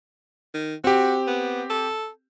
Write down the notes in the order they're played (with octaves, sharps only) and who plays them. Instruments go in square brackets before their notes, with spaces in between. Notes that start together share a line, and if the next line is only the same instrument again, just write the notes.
[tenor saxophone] D#3
[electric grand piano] C4 G4 [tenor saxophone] F#4
[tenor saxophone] B3
A4